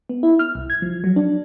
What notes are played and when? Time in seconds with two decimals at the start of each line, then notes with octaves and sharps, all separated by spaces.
0.09 B3
0.23 E4
0.39 F6
0.55 C2
0.70 G#6
0.82 F3
1.04 F#3
1.16 D4